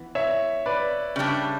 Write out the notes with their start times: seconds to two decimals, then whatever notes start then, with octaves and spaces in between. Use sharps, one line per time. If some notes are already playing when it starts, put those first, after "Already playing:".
Already playing: E3 B3
0.15 C#5 E5
0.66 B4 D5
1.16 C#3 G3 D4